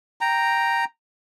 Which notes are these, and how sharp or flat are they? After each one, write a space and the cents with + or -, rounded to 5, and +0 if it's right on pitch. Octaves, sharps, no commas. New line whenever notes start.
G5 +0 A#5 +0